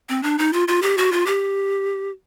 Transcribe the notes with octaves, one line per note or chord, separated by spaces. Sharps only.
C4
D4
D#4
F4
F4
G4
F#4
F4
G4